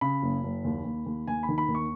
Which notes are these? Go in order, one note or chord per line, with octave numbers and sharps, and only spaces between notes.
C#3 B5
F#1
F#1
D#2
D#2
D#2
D#2 G#5
B5
D#3
B5
D#2
C#6